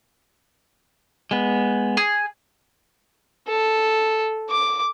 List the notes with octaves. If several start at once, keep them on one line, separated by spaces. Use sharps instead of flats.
G#3 B3
G#4
A4
D6